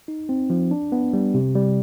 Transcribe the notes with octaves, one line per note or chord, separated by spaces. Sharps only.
D#4
C4
F3
D4
B3
G3
C3
G3